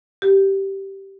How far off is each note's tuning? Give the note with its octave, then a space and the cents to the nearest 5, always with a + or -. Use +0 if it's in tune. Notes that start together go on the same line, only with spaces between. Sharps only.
G4 -10